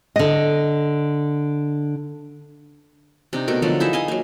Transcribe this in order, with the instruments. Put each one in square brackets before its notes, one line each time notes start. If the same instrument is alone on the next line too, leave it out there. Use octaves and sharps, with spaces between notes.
[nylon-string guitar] D3 D#5
[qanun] C3 D4 D#4
B2 A3 A#4
D3 F3 F#3 A4
D#4 E4 G#4 E5
D#5 F5 G#5
F#3 A#3